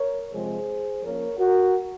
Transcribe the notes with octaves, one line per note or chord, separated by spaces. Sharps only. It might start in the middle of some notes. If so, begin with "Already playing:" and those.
Already playing: A#4 C#5
C3 F3 G#3 C4 G#4 C5
F3 A#3 C#4 A#4 C#5
F#4 A#4